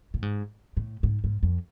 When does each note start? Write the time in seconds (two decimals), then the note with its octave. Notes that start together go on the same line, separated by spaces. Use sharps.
0.14 A2
0.22 G#2
0.77 A2
1.03 G#2
1.24 G#2
1.43 F2